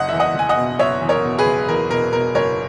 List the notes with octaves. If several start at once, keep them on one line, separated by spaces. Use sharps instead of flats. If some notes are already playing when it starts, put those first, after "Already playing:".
Already playing: F#1 D#5 F#5
E2 E5
D#5 F#5
F#1 G#5
D#5 F#5
B2
F#1 C#5 E5
E2
A#4 C#5
B2
G#4 B4
F#1
E2 A#4
B2 A#4
B2 A#4
F#1 A#4 C#5